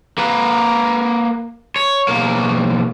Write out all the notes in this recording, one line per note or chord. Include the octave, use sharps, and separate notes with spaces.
A#3 B4
C#5
B1 A#3